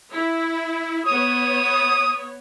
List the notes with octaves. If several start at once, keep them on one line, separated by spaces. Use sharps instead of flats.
E4
B3 C#5 D#6